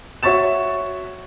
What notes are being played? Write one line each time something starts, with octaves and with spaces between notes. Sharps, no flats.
F#4 C#5 E5 C#6 A6 E7